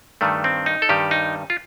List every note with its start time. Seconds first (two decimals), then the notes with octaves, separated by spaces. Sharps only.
0.21 G2 D#3 G3 A3
0.44 C4
0.66 D#4
0.82 A4
0.89 G2 D#3 G3 G4
1.11 D#4
1.50 F4